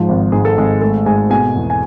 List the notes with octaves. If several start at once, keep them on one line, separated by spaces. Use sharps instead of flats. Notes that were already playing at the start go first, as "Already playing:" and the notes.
Already playing: G#2 F3 F4
G#1
G#2 G#4
A4
G#1 G#3 G#4
G#3 A3 A4
G#2 G#4 G#5
B2 G#4 G#5
E2
G#5